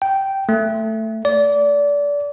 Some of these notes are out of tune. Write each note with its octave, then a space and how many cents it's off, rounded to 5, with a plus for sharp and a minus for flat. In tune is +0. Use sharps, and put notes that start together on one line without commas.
G5 -10
A3 +10
D5 -25